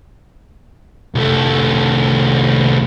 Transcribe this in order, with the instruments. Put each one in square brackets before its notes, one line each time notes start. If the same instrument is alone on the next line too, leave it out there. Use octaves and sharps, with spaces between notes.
[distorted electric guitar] C2 A3